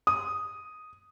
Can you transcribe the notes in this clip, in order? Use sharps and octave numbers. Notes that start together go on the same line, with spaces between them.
D#6